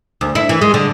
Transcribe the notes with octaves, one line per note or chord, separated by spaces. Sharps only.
D2
E4
E3
G#3
D3